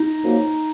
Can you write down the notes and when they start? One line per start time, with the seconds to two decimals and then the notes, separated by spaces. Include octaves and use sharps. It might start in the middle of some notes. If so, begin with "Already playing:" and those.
Already playing: D#4
0.24 F#2 F3 A#3